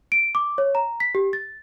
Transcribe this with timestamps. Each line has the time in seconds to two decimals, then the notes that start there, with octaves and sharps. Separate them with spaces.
0.12 D7
0.35 D6
0.58 C#5
0.75 A#5
1.00 B6
1.15 G4
1.33 A6